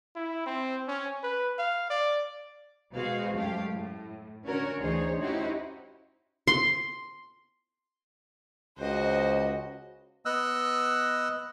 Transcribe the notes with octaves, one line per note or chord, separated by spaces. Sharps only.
E4
C4
C#4
B4
F5
D5
B2 G#3 F#4 G#4 C5 F5
F#2 G#3 A3 G4 F5
A2
D3 C#4 F#4 A#4 C#5
D2 E3 D#4 G#4 C5 C#5
C#4 D#4 E4 F#4 G4 C5
C6
C#2 F#4 C5 D#5
B3 D#5 E6 F#6